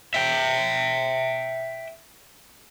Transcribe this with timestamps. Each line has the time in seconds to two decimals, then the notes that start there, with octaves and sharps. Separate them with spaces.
0.14 E5 G5